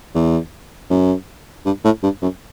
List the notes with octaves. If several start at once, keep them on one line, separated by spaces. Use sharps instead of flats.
E2
F#2
G2
A2
G2
F#2